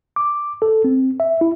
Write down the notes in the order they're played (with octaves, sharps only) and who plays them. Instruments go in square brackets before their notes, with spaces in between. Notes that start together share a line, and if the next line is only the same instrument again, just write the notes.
[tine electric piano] D6
A4
C4
E5
E4